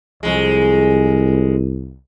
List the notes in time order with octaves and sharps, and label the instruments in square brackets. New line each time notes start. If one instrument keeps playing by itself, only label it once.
[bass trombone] C2 [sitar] F2 G#3